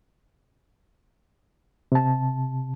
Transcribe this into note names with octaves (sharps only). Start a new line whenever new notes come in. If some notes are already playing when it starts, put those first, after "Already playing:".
C3 A5